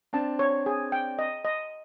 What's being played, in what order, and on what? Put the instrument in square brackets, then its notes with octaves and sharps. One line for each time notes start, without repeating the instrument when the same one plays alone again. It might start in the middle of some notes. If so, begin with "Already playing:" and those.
[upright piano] C4 D4 [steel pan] A5
[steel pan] C#5
G#4
G5
D#5
D#5